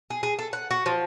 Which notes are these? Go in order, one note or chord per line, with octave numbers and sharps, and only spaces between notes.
G#4
G#4
A4
F#5
F#4
F3